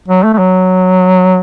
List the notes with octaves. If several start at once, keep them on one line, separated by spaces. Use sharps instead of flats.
F#3
A3
A3
F#3